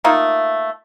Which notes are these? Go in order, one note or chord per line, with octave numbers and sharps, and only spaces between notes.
A3 A#3 D#4 F4